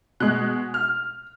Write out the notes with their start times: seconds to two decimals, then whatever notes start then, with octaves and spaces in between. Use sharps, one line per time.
0.20 B2 G#3 F#6
0.74 F6